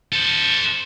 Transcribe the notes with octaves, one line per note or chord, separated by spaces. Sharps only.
A4 C5